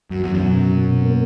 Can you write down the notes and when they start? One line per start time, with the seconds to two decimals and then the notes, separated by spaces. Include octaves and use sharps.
0.10 F#2 F#3
0.23 E2
0.34 F#2
0.42 B2
0.74 B2
1.05 A#3